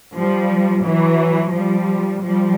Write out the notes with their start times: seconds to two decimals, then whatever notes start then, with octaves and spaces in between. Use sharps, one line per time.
0.15 F3 G3
0.84 E3 F#3
1.52 F3 G3
2.22 F3 G3